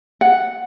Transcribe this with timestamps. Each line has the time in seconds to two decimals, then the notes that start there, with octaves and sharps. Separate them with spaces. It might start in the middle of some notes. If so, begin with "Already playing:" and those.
0.21 F#5